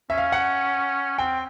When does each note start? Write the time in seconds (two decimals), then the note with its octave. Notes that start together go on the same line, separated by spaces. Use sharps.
0.10 C#4 E5
0.18 F5
0.32 F#5
1.19 C4 G5